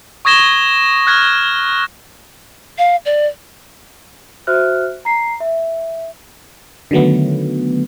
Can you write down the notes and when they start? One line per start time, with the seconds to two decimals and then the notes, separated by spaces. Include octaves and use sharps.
0.25 C#6 D#6 G#6 A#6 E7 G7
1.07 F6 F#6 G#6 A#6
2.78 F5
3.06 D5
4.47 F#4 C5 E5 F6 F#6
5.05 A#5 C7
5.40 E5
6.91 D3 D#3 F#3 A3 B3